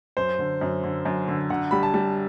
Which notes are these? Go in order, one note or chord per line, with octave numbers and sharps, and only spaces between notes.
F#2 C5
D3
F#2
D3
F#2
D3
D3 F#5
G3 B5
A5
G3